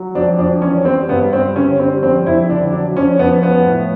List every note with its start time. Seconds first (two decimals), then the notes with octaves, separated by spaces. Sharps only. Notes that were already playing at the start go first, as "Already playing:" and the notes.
Already playing: F#3
0.15 F2 D4
0.38 F2 D4
0.62 E3 C#4
0.85 G3 C4
1.09 G2 B3
1.32 G2 C4
1.56 D3 C#4
1.80 G3 C4
2.02 F2 C4
2.25 F2 E4
2.49 D3 D4
2.72 F#3 D4
2.96 F2 C#4
3.19 F2 B3
3.43 F3 B3
3.66 A2